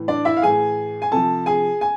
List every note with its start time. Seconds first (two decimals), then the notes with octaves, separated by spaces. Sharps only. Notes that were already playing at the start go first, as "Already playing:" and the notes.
Already playing: A2 E3
0.08 D4 D5
0.25 E4 E5
0.37 F5
0.42 A2 E3 G#4 G#5
1.02 G#5
1.12 C3 F3 A4 A5
1.46 G#4 G#5
1.81 G#5